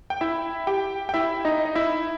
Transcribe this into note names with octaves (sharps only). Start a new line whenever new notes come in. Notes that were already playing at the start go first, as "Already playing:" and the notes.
G5
E4 E5
G4 G5
G5
E4 E5
D#4 D#5
D#5
E4 E5